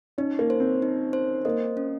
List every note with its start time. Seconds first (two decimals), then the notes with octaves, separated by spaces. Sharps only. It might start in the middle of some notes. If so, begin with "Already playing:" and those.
0.18 C#4 D#4
0.39 A#3
0.50 C5
0.60 C4
0.82 D#4
1.13 C5
1.45 A#3 D#5
1.77 C#4